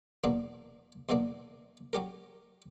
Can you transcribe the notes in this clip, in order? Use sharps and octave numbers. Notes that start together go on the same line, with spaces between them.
E2 B2 F#3 A#3 D4
E2 B2 F#3 A#3 D4
F#3 C#4 G4 A#4